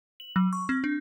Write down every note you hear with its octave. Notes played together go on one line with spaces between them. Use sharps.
F#7
F#3
C#6
C4
D4